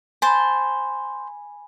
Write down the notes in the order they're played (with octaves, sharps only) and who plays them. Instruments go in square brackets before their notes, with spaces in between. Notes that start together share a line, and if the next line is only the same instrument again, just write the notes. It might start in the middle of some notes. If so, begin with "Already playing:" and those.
[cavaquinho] C5 A5 [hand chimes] G#5 B5